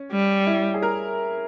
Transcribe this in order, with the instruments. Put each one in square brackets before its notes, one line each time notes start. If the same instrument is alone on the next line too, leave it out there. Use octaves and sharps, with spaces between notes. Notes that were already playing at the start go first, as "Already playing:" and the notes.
Already playing: [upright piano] C#4
[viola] G3
[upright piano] E4
G#4
A#4